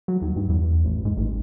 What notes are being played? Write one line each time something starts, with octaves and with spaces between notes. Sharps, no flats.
F#3
D#2
G2
E2
A1
G#2
A1